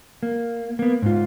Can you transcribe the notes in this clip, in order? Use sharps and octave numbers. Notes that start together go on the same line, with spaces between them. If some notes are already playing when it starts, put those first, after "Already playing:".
A#3
A#3 B3
G#2 F4